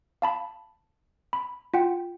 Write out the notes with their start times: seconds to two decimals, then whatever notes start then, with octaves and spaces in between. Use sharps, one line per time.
0.22 F5 A5 B5
1.33 B5
1.74 F4 F#5 G5